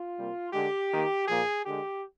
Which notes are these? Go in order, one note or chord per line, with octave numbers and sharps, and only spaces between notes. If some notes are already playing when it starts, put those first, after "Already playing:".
Already playing: F4
C3 G3 A#3
D3 G#3 G4
D#3 A#3
A#2 F3 A#3 G#4
D3 G#3 G4